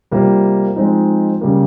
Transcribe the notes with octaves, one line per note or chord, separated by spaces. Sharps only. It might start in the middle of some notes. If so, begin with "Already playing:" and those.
C3 G3 A#3 F4
F3 G#3 C4 D#4
C#3 G3 A#3